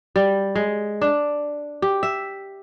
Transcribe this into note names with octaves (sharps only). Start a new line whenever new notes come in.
G3
G#3
D4
G4
E5